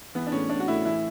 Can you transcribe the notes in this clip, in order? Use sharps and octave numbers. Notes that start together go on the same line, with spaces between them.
E3 B3
D4
A2 C#4
A2 D4
F#4
A2 E4
E3 E4